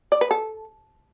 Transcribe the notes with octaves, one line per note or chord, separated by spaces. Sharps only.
D5
B4
A4